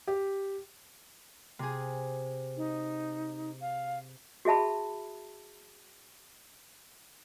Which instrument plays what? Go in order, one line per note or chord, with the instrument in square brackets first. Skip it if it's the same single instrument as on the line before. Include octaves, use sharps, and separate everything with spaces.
[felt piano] G4
[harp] C3 G#4
[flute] D#4
F5
[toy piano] F#4 G#4 E5 A5 B5